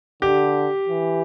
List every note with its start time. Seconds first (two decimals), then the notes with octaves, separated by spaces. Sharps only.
0.22 D3 G4
0.89 E3